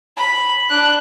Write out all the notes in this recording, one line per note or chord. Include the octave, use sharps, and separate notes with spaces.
B5
D4 F#6